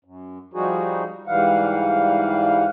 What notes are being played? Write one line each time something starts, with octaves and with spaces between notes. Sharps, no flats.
F#2
F3 G3 D#4 F#4 G#4
G#2 E3 G3 F5 F#5